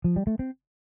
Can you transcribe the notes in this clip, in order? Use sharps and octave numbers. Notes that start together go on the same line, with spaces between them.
F3
G3
A3
C4